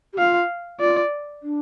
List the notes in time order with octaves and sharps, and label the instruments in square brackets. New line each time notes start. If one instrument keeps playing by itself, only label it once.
[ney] G4
[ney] F4 [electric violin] F5
[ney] F4 [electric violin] D5
[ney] D4